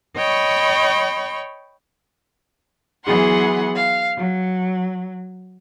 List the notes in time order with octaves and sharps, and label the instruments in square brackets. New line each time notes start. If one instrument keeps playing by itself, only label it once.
[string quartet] C#5 D#5 G5 B5 C#6
E3 F#3 B3 G#4 F#5 C6
F5
F#3